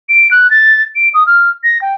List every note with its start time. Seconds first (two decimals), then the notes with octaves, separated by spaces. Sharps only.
0.09 D7
0.31 F#6
0.51 A6
0.96 D7
1.14 D#6
1.27 F6
1.64 A#6
1.82 G5